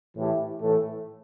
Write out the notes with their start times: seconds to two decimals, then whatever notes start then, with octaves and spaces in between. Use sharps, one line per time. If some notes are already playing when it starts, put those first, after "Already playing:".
0.16 A2 E3 A3 E4 G4
0.60 A2 E3 A3